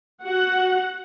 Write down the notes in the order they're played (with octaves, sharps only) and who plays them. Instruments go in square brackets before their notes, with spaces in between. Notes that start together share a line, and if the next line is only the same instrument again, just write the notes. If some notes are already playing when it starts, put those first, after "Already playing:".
[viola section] F#4 F#5